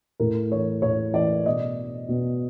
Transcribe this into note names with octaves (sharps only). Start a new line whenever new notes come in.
A2 A#4
E3 C#5
A2 C#5
E3 D5
B2 D#5
B2